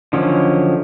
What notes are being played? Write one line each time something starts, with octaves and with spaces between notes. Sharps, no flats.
D3 D#3 F3 F#3 C#4